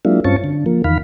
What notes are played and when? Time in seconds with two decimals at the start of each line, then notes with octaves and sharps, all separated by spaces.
0.05 F#3 G#3 A#3 D4 E4 F4
0.25 G2 C4 C#4 F4 A5 C#6
0.44 D3
0.66 F3 A#3
0.84 E2 D#3 F5 B5